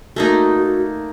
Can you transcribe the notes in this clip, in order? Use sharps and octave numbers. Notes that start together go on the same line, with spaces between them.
A3 A#3 D#4 F#4